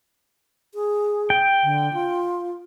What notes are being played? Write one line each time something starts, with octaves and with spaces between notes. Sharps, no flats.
G#4
G5
D3
F4